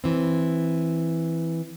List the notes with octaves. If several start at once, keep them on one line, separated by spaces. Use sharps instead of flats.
E3 C4